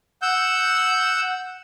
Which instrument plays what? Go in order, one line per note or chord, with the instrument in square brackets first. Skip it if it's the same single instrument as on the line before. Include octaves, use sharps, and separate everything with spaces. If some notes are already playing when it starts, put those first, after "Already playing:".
[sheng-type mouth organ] F#5 E6 G6